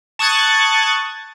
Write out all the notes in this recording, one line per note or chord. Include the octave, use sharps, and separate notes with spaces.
A5 C#6 D#6 F#6 G#6 A6